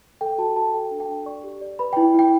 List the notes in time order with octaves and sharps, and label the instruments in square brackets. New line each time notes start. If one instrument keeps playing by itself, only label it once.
[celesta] A4 G5
F#4 A5
F#4 A5
A4 G5
D4
G5
D4
D5 C#6
G4
D5
B4 B5
E4 G5
E4 G5